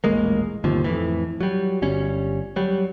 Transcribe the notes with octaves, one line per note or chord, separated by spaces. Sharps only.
D#1 A1 G#3 A#3
G1 D#2 C3 F3
F2 A2 E3
F#3 G3
G1 G3 C#4
F#3 G3